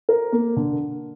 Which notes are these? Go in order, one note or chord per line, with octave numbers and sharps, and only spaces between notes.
A#4
A#3
D3